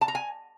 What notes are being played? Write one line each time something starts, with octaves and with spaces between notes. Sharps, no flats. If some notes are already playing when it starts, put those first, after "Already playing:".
A5
A#5
G#5